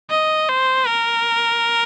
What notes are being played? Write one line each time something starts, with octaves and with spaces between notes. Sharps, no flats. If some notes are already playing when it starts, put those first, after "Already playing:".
D#5
C5
A#4